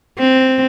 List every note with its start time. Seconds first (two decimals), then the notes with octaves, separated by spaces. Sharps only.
0.19 C4